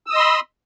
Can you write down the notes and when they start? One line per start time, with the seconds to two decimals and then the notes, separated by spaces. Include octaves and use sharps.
0.06 E6
0.10 D#6
0.13 D#5
0.16 C6
0.19 B5